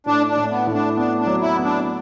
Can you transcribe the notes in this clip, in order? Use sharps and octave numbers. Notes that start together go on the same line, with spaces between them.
A2 D4
D4
A2
B3
A2
D4
B3 D4
D4
F#3
E4
B3
D4